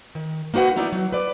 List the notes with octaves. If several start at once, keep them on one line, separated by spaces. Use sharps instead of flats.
D#3
A#3 D#4 F#4 B4 F#5
A3 B3 D#4 E4 D5
F#3
B4 D5